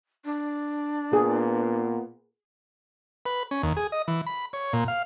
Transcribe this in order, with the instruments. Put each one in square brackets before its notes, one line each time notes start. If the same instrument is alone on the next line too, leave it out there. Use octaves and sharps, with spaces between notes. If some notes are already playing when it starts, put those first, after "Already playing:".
[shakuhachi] D4
[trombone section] A#2 B3 [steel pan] G#4
[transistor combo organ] B4
C#4
D#2
G#4
D#5
E3
B5
C#5
A#2
F5